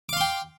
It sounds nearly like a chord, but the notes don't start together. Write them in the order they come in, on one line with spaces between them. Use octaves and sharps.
D6 F5 C6 G5